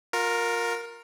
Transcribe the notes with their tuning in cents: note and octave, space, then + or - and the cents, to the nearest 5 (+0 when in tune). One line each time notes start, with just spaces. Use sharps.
F4 +35 A#4 +0